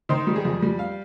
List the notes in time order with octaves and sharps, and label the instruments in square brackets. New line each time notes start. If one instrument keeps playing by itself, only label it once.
[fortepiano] D#3 C5
G3
G#4
F2
G3
F5